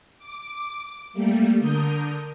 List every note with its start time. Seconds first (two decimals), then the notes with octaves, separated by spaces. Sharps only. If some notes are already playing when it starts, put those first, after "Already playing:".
0.19 D6
1.13 G3 A3 A#3
1.60 D3 A#4 D#6 G6